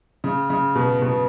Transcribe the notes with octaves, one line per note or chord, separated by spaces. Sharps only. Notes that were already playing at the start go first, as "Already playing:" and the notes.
C#3
C#3
B2
B2